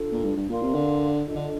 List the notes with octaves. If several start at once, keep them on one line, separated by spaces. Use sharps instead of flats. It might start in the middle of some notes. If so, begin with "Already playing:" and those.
Already playing: D4 F4 A4
A#2
G2
G2
A#2 A#4 D5 F5 C6
C3
D3
D4 F4 A4 D#5
D3